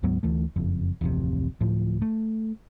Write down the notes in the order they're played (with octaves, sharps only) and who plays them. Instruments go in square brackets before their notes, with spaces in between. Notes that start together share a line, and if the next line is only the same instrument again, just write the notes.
[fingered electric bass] D2 G#2 F#3 B3
D2 E3 A3
F#1 F2
D1 A1 F2 C3
D1 A2 F3
A3